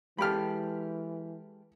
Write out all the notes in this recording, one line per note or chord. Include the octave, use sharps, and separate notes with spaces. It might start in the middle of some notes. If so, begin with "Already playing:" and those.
E3 G#3 G4 A4 B5 F6